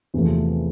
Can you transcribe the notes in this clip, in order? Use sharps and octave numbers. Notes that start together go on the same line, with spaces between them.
E2 C3 F3 A3